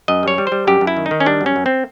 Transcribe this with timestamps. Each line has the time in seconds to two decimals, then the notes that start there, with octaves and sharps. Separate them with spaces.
0.08 F#2 D#5
0.23 G3 C#5
0.38 G3
0.47 C5
0.52 G3
0.67 F#2 G4
0.81 F#2
0.87 E4
0.97 D#3
1.06 D#4
1.11 D#3
1.20 C#4
1.26 G3 D4
1.41 F#2
1.46 C#4
1.56 F#2
1.66 C4